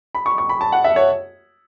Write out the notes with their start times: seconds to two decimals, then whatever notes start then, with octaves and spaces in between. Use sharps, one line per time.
0.15 B5
0.26 C#6
0.38 C#6
0.49 B5
0.61 A5
0.72 F#5
0.84 E5
0.96 C#5